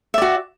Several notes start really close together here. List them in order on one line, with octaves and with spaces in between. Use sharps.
E5 D5 F#4